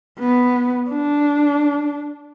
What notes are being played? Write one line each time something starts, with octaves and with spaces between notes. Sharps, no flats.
B3
D4